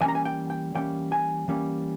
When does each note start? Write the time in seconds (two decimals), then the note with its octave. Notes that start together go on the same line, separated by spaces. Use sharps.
0.01 E3 G3 A#3 C#4 G#5
0.08 A#5
0.15 G#5
0.25 G5
0.50 G5
0.75 E3 G3 A#3 C#4 G5
1.12 G#5
1.48 E3 G3 A#3 C#4